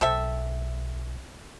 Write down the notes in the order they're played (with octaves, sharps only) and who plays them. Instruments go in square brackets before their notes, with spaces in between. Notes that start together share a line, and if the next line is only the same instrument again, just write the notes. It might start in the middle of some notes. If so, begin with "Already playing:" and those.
[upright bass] B1 [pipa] C4 A4 E5